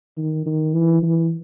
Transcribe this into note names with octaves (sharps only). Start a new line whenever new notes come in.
D#3
D#3
E3
E3